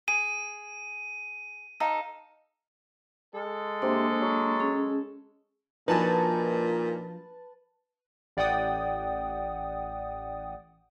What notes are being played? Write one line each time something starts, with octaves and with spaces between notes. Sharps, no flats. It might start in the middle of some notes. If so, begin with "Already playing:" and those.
G#4 D#7
D#4 A4 F5
G#3 A4
C3 A#3 D4
F#3
C#4 G#4
A#2 F3 D4 D#4 F#4 B4 G#5 A5
A1 D5 F#5 G5 D#6